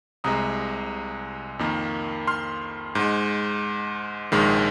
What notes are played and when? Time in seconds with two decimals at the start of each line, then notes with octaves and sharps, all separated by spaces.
0.24 C2 C3 G#3 A#5 D#6
1.59 F2 D#3 A#3
2.27 C6 F6
2.95 G#2 G#3
4.32 A#1 G#2 D#3 G#3